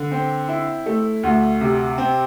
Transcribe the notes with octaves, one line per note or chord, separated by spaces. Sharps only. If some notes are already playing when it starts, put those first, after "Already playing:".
Already playing: D3
C4
E4
A3
D2
C3
C4